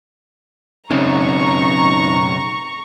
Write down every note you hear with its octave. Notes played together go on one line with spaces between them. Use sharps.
B1 F#2 C#3 C4 D#4 A#5 C#6